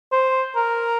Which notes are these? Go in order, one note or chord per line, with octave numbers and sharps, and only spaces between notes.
C5
A#4